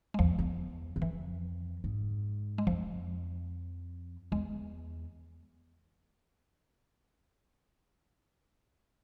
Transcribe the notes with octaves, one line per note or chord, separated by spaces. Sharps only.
G#3
E2 F3
E2
E2
F2 E3
G#2
G#3
F2 F3
E2 G#3